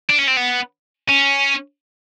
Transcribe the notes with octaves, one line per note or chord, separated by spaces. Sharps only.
D4
C#4
C4
B3
C#4